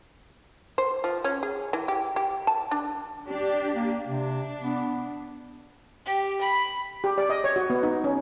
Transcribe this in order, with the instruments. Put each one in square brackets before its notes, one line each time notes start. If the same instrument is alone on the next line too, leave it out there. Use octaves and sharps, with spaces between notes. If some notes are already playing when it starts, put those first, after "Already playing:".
[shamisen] C5
F3
C#4
G#4
E3
G4
G4
A5
D4
[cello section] D4 G4
[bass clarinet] A#3
[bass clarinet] C3 [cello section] D4
[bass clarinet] B3
[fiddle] G4
B5
[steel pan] G4
D5
D#5
C#5
F#4
B3
D#4
C#4